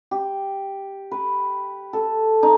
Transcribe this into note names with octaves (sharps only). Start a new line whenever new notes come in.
G4
B4
A4
D#4